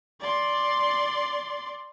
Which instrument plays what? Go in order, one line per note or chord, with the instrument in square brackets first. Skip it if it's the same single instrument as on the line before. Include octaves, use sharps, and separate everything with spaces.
[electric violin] D5 C6